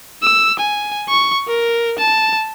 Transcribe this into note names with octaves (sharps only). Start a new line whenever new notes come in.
E6
G#5
C#6
A#4
A5